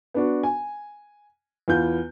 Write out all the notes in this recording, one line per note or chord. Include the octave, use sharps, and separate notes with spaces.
B3 D4 F#4
G#5
E2 B3 F4 G6